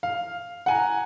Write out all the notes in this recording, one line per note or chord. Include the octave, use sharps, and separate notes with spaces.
F5
F#5 G#5 A#5